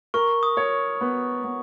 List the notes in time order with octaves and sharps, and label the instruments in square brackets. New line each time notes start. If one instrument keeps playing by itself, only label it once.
[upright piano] A#4 [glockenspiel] C#6
[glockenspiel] D#6
[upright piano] C#5
B3
B3